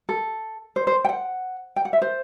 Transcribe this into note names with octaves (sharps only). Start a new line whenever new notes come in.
A4
C5
C5
G5
F#5
G5
F#5
E5
C5